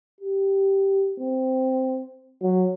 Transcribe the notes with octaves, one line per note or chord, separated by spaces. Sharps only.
G4
C4
F#3